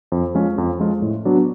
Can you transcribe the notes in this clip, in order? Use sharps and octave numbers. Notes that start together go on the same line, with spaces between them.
F2
F3 G#3 C#4 F4
F2
F3 G#3 C#4 F4
A2
F#3 B3 D4 F#4